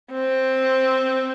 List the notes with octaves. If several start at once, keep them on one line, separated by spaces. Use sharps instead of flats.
C4